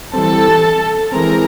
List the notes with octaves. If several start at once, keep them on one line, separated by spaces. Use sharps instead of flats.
E3 G3 C4 A4 A5
E3 G#3 C4 A#4 A#5